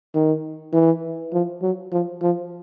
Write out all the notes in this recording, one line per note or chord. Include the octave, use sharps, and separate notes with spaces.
D#3
E3
F3
F#3
F3
F3